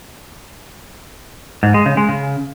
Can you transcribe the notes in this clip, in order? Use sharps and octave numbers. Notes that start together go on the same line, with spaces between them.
G#2
G#3
C#3
G#3
C#3